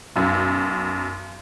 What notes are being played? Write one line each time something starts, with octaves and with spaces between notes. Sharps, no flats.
B1 F#2